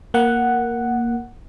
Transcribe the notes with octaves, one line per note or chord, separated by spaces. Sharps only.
A#3 F#5